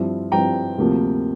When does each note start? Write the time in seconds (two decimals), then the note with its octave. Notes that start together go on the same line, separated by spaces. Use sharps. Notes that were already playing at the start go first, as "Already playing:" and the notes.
Already playing: G2 F3 C4 E4
0.32 G2 F3 C4 E4 G5 A#5
0.78 D2 C3 F3 A#3